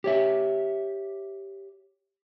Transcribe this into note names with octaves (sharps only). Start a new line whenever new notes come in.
G4 C#5 E5